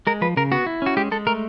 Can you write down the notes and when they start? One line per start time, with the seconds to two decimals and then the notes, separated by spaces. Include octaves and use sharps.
0.07 G#3 A#4
0.21 F3 B4
0.37 C#3 A#4
0.52 B3 F#4
0.66 E4
0.82 C#4 F#4
0.97 G#3 G4
1.11 G#3 A4
1.27 A3 A#4